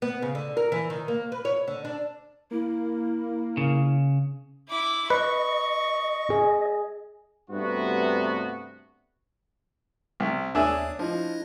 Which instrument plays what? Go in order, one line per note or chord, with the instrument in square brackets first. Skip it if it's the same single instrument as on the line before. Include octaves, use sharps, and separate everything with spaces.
[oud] B3
C#3
D3
A#4
E3
D#3
A#3
B4
C#5
D3
D4
[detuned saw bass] A#3 [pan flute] E4
[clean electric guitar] C#3
[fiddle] E4 D6
[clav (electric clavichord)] B4 [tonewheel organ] D#5 [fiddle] C#6
[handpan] G#4
[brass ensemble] G2 C3 A3 B3 F#4
[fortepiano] C2
[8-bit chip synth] D#2 C#5 [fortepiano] D4 G#4 E5
[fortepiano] F3 [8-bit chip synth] D4 E4 D#5